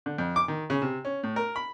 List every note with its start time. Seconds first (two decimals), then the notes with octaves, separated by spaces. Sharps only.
0.06 D3
0.18 F2
0.36 D6
0.48 D#3
0.70 C#3
0.82 C3
1.05 C#4
1.23 A2
1.36 A#4
1.56 B5